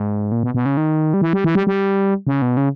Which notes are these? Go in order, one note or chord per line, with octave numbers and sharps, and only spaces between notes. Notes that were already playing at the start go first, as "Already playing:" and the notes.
Already playing: G#2
A#2
B2
B2
C#3
D#3
G3
E3
G3
E3
G3
G3
C#3
B2
C#3